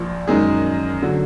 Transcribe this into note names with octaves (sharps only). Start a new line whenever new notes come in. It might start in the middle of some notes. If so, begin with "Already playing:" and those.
Already playing: A#1 A#2 F3
F#2 D#3 G#3 D#4 G#4
D3 F#3